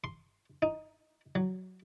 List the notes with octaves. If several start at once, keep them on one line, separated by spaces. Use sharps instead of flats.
C6
D#4
F#3